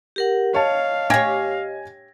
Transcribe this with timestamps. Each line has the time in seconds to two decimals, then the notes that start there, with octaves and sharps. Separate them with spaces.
0.16 G4 A#4 F#5
0.54 C#5 D#5 F5 A5
1.10 G4 C#5 G#5 G#6 A#6